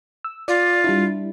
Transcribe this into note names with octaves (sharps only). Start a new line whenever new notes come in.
E6
F4 D5
G3 D4 E4